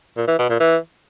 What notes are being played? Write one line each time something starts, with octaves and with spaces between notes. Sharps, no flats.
A#2
E3
B2
A#2
E3